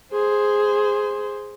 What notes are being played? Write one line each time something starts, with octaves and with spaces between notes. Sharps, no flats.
G#4 C5